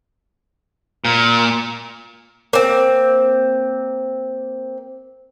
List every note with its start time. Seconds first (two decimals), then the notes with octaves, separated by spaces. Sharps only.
1.05 A#2
2.53 A#3 C4